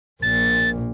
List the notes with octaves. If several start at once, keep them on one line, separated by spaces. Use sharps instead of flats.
A#1 A#2 A6